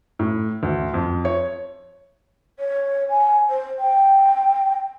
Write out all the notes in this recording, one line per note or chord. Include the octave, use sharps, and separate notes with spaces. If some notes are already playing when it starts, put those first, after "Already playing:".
A2
D2
F2
C#5
C#5
G#5
C5
G5